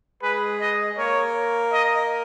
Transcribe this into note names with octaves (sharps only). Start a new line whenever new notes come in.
G#3 G#4 B4
D#5
A#3 A#4 C#5
D#5